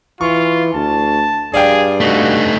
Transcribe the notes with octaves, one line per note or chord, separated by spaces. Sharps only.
E3 F4 C#6
D2 A5
G2 G#4 D5 F5 G5
A3 D#4 F#4